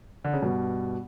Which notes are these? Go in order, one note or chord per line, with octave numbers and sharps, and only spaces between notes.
D3
C#3
G2 B2